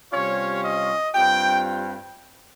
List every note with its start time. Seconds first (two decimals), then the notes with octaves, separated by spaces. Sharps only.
0.13 C3 G3 C#4 F4 C#5
0.64 D#5
1.15 G2 G3 C4 F4 G5